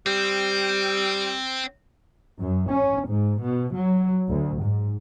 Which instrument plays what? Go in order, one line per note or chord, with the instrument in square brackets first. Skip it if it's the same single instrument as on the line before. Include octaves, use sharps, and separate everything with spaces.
[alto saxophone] G3 [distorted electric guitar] C4
[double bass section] F#2
C#4
G#2
B2
F#3
D2
G#2